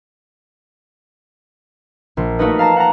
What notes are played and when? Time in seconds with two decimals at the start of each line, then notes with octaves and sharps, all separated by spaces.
2.17 A#1
2.39 A3 A#3 D#4 F#4 B4 D#5
2.59 F5 A5 A#5 A#6 E7
2.76 F#5 A5 A#5